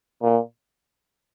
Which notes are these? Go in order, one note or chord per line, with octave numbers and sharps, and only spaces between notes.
A#2